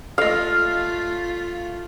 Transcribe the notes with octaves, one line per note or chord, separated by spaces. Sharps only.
A3 F4 A4 D#5 F5